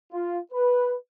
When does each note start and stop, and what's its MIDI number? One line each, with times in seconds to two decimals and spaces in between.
0.12 0.39 65
0.52 0.95 71